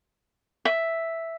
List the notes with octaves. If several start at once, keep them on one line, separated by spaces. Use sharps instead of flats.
E5